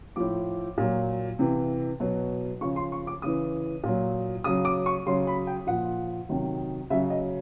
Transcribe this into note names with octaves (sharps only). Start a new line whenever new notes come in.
A2 F3 D6
A#2 F#3
C3 E3
B2 F#3
C#3 F3 C#6
C6
C#6
D6
C#3 E3 D#6
A#2 F#3
C#3 F#3 D#6
D6
C#6
C#3 F#3 C6
B5
G5
A#2 F3 F#5
C3 D#3 F#3
C#3 F#3 E5
D#5